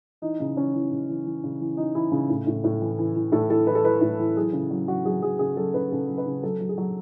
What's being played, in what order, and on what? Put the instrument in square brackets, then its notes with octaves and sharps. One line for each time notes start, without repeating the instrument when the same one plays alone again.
[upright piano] E3 D#4
C#3 D#4
E3 C#4
E3
C#3
E3
E3
C#3
E3
E3 D#4
E3 E4
C#3
A2
A2
A2
E3
E3
E3
A2 A4
E3 A4
E3 B4
A4
E3 B4
A2
E3
F#3 G#4
C#3
F#3
F#3 F#4
F#3 G#4
F#3 G#4
C#3 G#4
F#3 A4
C#3 B4
C#3 A4
F#3
B4
C#3
F#3 A4
F#3
G#4
F#3